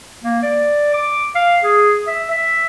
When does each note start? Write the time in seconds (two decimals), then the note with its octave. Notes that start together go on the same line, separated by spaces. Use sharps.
0.24 A#3
0.43 D5
0.94 D6
1.35 F5
1.64 G#4
2.07 E5
2.31 E5